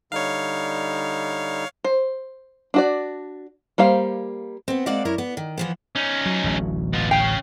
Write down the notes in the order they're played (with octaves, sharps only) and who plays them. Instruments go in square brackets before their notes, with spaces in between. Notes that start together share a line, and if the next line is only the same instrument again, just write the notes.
[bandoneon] D3 G3 D#4 [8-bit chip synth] C#5 F5
[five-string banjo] C5
D4 F#4 D5
G3 A#3 C5 F5
[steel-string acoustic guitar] B3 C4
G#3 A#3 C4 D5 F5 F#5
F#2 E4 A#4 C#5
B3
D#3
E3 F3 B3
[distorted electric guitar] C#4 D#4
[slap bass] F#3
D1 A1 F#3
[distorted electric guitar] B2 F4
[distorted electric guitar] C#4 F5 [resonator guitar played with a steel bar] G5